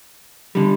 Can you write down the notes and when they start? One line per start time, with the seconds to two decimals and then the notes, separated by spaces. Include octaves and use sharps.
0.55 D3 G3